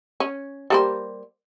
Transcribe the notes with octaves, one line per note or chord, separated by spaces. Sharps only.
C#4
G3 A#3 C5